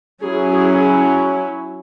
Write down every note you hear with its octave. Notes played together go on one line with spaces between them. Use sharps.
F#3 C#4 E4 G#4
G#4